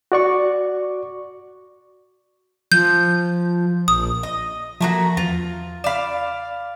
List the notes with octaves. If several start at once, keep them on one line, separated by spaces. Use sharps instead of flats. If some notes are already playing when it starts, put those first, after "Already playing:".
F#4 D5 C#6
F3 G6
A#1 D#6
D#5
F3 A3 A#3 F#4
E2 F4
D5 F5 B5 E7